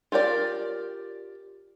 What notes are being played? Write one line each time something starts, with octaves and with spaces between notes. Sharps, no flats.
F4 G4 A#4 D5